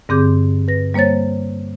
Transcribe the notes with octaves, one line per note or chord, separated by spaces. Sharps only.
G2 D3 C4 G#4 D6 G6
B4 A#6
G3 A#3 C5 C#5 A6